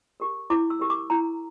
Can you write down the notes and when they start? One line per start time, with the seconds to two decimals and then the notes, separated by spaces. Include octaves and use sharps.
0.20 G4 A#4
0.50 E4 D6
0.70 E6
0.80 G4 A#4
0.90 D6
1.10 E4 A#5